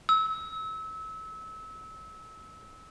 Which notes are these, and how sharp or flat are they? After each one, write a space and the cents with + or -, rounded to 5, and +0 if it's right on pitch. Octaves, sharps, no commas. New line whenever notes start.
E6 -25